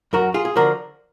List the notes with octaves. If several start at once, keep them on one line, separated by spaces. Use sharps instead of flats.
F#2 F#4 A#4
F4 G#4
G#4
D3 F3 F#4 A#4